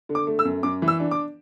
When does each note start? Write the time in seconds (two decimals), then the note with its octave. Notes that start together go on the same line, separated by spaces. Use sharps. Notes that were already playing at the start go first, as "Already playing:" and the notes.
0.09 D3
0.15 D6
0.27 A3
0.39 E6
0.45 F#2
0.63 F#2 D6
0.82 E3
0.88 E6
1.00 D4
1.11 D6